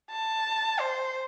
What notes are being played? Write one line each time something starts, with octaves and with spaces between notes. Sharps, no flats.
A5
C5